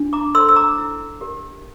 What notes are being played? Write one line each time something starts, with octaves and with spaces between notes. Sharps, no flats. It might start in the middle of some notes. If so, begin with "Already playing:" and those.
Already playing: D4
A#5 D6
A4 C5 C6 E6
E6
A#5 D6
E4
G4 A#4